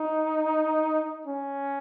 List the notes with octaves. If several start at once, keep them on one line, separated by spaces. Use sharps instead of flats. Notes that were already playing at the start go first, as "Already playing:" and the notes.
Already playing: D#4
C#4